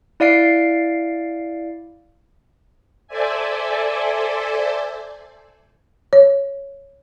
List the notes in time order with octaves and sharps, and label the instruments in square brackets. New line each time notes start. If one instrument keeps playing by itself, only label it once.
[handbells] E4 D5 F5 C7 D7
[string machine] A4 C5 D5 E5 G#5
[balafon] C#5